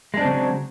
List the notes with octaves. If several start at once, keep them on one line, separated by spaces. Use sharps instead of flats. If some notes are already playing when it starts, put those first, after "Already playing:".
C#3 F#3 G#3 C4 D4